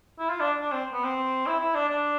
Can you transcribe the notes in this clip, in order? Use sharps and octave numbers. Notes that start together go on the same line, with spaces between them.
E4
F4
D4
D4
C4
B3
C4
E4
E4
D4
D4